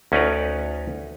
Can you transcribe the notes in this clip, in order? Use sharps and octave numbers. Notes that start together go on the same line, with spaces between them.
D2 C#4 D#4 B4 D5 A#5